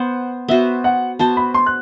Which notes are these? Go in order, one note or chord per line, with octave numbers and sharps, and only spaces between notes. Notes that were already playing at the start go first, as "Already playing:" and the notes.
Already playing: B3 C5 F#5
B3 F#4 C5 E5
F#5
B3 F#4 C5 A5
B5
C6
F#6